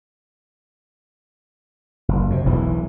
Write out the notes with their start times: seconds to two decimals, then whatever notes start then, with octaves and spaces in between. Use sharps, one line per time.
2.08 F#1
2.30 F#2 C3
2.45 E1 B1 C3 E3